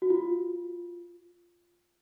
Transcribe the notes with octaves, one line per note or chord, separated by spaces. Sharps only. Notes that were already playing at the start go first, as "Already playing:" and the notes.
F#4
F4